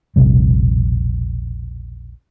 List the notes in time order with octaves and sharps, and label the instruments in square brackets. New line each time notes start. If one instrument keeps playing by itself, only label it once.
[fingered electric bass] E1 A#1 C3 G3